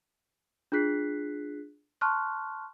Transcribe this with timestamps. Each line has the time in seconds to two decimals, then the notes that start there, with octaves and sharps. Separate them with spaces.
0.72 D4 F4 G#4 F#6 B6 C7
2.01 A5 C6 C#6 F6 F#6